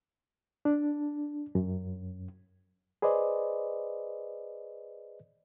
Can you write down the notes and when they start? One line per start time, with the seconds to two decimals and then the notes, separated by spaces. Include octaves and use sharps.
0.65 D4
1.55 F#2
3.02 G#4 B4 C5 D5 D#5